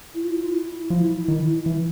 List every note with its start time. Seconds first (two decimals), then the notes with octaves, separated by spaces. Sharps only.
0.14 E4
0.24 F4
0.33 E4
0.43 F4
0.53 E4
0.90 F3
1.28 D#3
1.66 E3